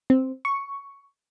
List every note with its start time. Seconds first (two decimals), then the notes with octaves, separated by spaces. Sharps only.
0.10 C4
0.45 C#6